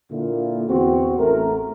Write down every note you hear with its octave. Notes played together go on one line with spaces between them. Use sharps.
A#2 D3 A#3 E4 F4
E2 C4 F#4
A1 A3 A#4